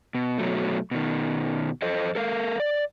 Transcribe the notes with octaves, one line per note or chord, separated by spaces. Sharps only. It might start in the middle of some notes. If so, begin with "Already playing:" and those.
B2
B2 F#3 A3
B2 D#3
F2 A4 C5 D#5
A4 A#4 F5
D5